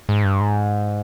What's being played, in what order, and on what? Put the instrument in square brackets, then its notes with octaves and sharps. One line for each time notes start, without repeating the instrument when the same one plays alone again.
[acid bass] G#2
G2
G#2